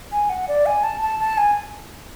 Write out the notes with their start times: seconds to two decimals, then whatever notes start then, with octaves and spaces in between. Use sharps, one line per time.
0.12 G#5
0.30 F#5
0.48 D5
0.66 G#5
0.83 A5
1.02 A5
1.20 A5
1.38 G#5